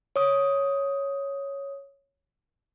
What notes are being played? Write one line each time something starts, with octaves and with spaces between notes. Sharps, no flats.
C#5 D#6